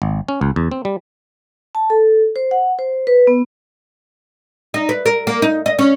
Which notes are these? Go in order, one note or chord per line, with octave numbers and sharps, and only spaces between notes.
G#1
C#4
C#2
E2
C4
G3
A5
A4
C5
F#5
C5
B4
B3
D#4
B4
A#4
A#3
D#4
D#5
C#4